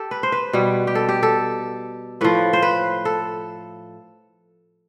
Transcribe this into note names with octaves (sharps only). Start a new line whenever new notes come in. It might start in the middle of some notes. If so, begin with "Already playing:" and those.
Already playing: G4 A4
B4
C5
B4
B2 G3
G4
A4
G4
A4
A2 F3 B4
C5
B4
A4